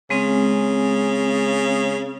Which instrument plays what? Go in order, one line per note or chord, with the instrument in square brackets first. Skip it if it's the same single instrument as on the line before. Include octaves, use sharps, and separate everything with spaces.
[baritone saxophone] C#3 [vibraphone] G#3 C4